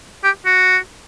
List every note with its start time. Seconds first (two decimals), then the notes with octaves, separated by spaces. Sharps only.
0.24 G4
0.45 F#4